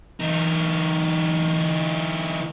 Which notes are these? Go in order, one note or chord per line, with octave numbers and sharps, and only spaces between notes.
E3 D#4